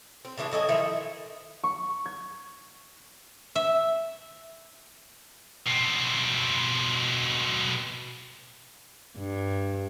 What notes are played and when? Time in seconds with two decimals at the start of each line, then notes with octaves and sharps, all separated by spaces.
0.25 C4
0.38 C#3 E3 D4 G#4
0.51 A2 F#3 D#5 G#5
0.69 D#3 F3 E4 E5
1.64 C#6
2.06 G#6
3.55 E5
5.66 B2 C4
9.17 G2